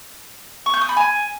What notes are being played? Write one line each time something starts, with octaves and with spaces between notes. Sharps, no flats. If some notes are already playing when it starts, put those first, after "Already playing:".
C#6
G6
D#6
B5
G#5